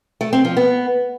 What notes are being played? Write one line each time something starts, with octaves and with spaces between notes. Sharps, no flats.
A3
C4
F3
B3